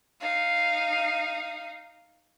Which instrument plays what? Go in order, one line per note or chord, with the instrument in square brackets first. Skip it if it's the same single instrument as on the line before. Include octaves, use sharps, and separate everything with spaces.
[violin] D#4 F5